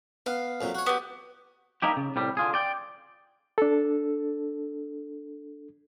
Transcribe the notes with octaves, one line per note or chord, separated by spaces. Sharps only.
B3 F5
F2 A#2 F#3
F#4 C#5
B3 G4
G3 A#3 D#4 E4 G4
C#3
C2 A2 G3
D3 F4 G#4
D5 G5
D4 A4